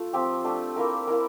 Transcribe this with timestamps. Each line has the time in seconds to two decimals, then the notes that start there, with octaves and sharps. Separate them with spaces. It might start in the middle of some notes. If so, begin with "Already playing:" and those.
Already playing: A3 F4
0.13 F3 C4 G4
0.44 A3 D4 G4
0.76 A#3 E4 A#4
1.07 A#3 E4 A#4